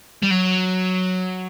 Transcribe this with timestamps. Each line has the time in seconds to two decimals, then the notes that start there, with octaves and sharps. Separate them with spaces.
0.23 G3
0.31 F#3